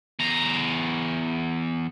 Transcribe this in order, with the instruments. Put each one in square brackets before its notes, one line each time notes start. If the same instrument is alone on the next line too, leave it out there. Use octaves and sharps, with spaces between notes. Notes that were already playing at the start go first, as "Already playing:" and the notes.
[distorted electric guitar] E2 A#5